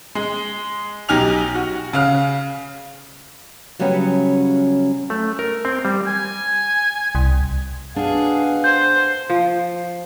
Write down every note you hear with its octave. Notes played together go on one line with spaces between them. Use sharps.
G#3
B1 D#4 G4 G#5 F6 F7
F#4
C#3 F5 F6
C#3 F#3 G3 B3 C#4
A3
A#4
C4
G3
G#5
C2
B2 D4 G#4 F5 F#5
C5 G6
F3